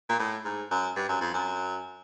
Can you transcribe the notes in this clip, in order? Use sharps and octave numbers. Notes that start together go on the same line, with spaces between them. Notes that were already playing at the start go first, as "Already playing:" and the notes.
A#2
A2
G#2
F#2
G2
F#2
F2
F#2